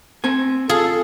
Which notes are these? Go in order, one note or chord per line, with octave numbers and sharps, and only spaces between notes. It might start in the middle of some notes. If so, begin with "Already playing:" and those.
C4 G#5
F4 G#4 A4